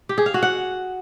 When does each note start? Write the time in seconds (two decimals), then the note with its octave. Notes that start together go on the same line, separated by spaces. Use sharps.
0.09 G4
0.18 G#4
0.26 F5
0.34 F#4
0.43 F#5